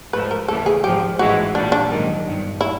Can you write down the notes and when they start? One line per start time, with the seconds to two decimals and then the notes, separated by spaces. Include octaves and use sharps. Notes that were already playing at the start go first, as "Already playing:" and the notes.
0.13 G#2 F3 A3 B4
0.31 A#4
0.48 D#2 C#3 E3 A3 A4
0.66 G#4
0.84 G#1 G#2 F3 G4
1.19 A1 G#2 E3 G#3 F#4
1.55 A#1 A#2 G3 D4
1.72 D4
1.90 A#1 G#2 D#3 F#3 A#3
2.26 G1 G2 D#3
2.61 E4